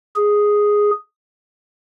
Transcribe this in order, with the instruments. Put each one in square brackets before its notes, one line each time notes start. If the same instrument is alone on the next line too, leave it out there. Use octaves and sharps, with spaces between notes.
[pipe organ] G#4